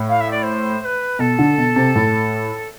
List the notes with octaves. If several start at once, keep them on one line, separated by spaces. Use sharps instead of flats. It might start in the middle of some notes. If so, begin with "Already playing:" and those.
Already playing: A2
F5
E5
D5
C5
C5
B4
B2 A4
D3
B2
C3
A2